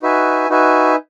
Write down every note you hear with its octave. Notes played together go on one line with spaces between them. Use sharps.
D#4 F#4 B4 E5 G#5
D#4 F#4 B4 E5 G#5